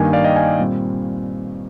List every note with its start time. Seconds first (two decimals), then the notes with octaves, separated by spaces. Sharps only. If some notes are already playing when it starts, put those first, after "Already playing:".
Already playing: G2 D#3 A#3 G#5
0.13 D5 F5
0.24 D#5 G5
0.36 F5 G#5
0.59 A#2 G3 C4